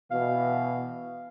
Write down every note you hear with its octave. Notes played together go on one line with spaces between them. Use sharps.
B2 E3 F5